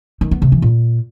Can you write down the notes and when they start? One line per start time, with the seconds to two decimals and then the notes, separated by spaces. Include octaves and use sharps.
0.21 D#3
0.31 B3
0.42 C3
0.52 E3
0.62 A#2